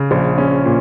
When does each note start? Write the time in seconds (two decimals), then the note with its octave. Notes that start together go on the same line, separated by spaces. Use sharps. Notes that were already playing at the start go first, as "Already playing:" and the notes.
Already playing: C#3
0.11 A#1
0.38 C#4
0.65 A#2